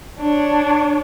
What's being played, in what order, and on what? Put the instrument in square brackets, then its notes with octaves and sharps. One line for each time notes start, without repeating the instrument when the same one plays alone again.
[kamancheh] D4 C#5